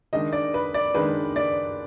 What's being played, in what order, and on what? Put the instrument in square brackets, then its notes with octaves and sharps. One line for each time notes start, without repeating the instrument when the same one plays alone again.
[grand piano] D#3 G#3 D4 D#5
D5
B4
D5
D#3 G#3 D4 B4
D5